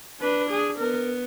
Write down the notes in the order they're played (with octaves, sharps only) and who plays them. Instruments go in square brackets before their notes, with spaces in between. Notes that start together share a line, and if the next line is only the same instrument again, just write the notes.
[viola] D4 [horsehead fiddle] B4
[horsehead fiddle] G#4
[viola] B3 [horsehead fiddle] A#4